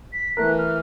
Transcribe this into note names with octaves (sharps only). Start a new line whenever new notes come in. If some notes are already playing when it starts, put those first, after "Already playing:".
B6
E3 A3 B3 A#4 F#6
F6